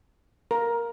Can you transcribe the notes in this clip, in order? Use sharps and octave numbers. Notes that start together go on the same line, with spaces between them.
A#4